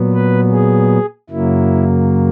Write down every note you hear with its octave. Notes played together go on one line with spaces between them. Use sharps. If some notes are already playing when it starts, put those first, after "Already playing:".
Already playing: A#2 F#3 B3
B4
G#4
F#2 C#3 F#3 A#3 E4